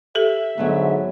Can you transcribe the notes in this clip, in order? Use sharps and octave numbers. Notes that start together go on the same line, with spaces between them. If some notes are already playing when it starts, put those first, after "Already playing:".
G4 A4 E5
G#2 D3 F#3 A3 B3